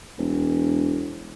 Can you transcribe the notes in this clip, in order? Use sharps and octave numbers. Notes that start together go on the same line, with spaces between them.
E1